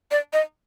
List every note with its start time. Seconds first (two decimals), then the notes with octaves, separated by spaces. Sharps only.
0.11 D5
0.33 D#5